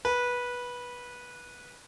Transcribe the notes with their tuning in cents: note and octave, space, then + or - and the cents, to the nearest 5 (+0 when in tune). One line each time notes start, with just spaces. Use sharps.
B4 -15